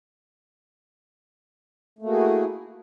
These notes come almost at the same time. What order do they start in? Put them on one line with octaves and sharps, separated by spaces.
A3 A#3 F#4 G#4 E4